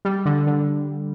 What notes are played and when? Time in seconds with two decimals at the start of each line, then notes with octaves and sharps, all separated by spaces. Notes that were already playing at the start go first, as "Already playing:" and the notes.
0.05 G3
0.26 D3
0.47 D3